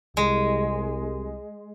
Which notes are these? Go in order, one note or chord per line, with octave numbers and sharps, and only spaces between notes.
C2 G#3